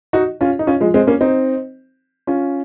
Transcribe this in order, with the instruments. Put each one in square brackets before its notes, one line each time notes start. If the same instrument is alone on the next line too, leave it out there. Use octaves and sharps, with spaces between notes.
[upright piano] D#4 F#4
C#4 F4
D#4
C#4 F4
F3 G#3
G#3 C4
A#3 C#4
C4 D#4
C#4 F4